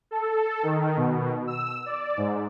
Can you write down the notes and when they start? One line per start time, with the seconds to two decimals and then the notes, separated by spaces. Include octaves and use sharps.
0.11 A4
0.63 D#3
0.97 B2
1.47 E6
1.86 D5
2.17 G#2